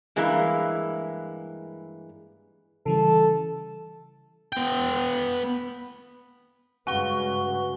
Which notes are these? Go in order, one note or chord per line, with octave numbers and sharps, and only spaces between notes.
G2 E3 G#3 A#3 E4
C#3 E3 G3 A4
B3 G5
G2 C#3 G#3 F#4 B4 G#5 C#6 G7